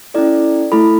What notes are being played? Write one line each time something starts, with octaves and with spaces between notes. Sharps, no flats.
C#4 E4 A4 D5
A3 E4 A4 B5